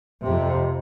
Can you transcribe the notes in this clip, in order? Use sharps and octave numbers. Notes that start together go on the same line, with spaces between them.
F2 C3